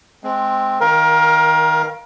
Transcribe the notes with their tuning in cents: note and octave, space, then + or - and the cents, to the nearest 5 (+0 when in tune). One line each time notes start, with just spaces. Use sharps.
G#3 +30 C4 +0
D#3 +0 A#4 +25 F5 +0